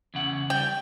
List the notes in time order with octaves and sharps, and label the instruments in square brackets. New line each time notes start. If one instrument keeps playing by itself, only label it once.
[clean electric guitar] E2 C#3 F#5
[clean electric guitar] G3 [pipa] G5